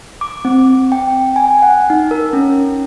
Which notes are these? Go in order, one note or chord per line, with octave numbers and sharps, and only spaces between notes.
D6
C4
G5
G#5
F#5
D#4
A#4
C#4